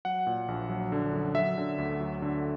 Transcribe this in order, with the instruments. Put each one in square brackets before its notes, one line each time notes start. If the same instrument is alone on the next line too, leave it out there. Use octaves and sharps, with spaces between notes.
[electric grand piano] F#3 F#5
A#2
A#1
F#3
D3
F#2
F#3 E5
D3
D2
F#3
D3